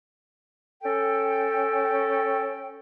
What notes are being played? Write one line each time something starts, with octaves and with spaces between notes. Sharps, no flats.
C#4 A4 G5